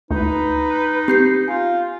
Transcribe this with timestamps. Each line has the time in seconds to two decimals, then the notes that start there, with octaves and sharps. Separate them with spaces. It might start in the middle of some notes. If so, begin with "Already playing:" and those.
0.11 D2 D#4 B4
1.08 C4 G4 G6 C7
1.48 F4 G#5